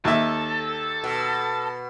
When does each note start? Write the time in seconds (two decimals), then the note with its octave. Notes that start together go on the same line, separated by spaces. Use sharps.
0.05 D#2 A4 E5
1.04 B2